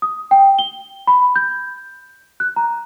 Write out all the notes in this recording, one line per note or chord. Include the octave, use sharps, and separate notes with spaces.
D#6
G5
G7
B5
G6
F#6
A#5